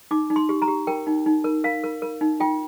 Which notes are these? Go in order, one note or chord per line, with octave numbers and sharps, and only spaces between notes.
D#4 D6
D#4
C6
G4
A#5
G4
A#4 G5
D#4
D#4
A#4
A#4 F5
A#4
A#4
D#4
F4 G5